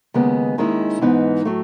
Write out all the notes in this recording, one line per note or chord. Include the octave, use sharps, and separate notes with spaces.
D#2 C#3 G#3 B3
D#2 D#3 G#3 C#4 E4
G#2 E3 B3 D#4
A2 F#3 A3